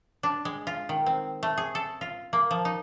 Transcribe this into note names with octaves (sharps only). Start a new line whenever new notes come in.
D4
G#3
F4
D#3
C4
A3
G#4
A4
F4
A#3
F3
D#4